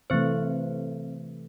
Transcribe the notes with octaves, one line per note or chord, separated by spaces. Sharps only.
C3 E3 A3 C4 C5